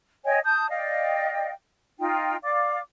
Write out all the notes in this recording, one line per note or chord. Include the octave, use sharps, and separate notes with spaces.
C#5 D#5 G5 G#5
A5 D#6 G6
D5 D#5 F5 G5
D#4 F4 G5
D5 F5 D6